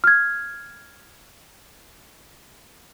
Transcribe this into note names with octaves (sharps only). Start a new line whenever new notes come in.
F6 G#6